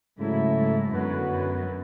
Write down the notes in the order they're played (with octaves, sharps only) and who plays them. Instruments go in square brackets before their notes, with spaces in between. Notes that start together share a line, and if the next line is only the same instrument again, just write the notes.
[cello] G#2 [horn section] C#3 F#3 A3 E4
[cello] G#2
[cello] F#2 [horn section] D3 F#3 B3 F#4 B4
[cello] F#2